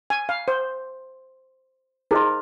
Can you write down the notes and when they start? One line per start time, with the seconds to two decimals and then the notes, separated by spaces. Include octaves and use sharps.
0.10 G#5
0.29 F5
0.48 C5
2.11 D#4 G#4 A#4 C5 D#5 C6